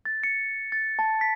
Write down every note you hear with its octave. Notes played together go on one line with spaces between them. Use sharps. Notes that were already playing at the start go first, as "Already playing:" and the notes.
A6
C#7
A6
A5
B6